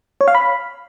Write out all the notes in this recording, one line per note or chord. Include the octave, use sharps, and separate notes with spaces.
C#5
F5
B5